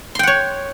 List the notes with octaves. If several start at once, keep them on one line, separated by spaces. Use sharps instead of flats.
C#5 F#5 G5 C6